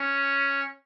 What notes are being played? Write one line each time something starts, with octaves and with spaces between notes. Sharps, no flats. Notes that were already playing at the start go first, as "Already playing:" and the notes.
Already playing: C#4